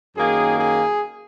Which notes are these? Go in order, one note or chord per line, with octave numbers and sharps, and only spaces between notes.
F#2 D#3 A#3 G#4
G#4